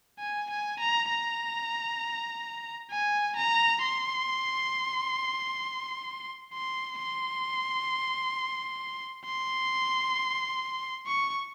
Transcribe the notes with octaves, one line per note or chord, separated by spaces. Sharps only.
G#5
G#5
A#5
A#5
G#5
A#5
C6
C6
C6
C6
C#6